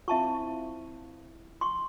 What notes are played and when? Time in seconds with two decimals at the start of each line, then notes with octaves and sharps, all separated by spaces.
0.08 C4 E4 F4 E5 A5 C#6
1.61 C6 C#6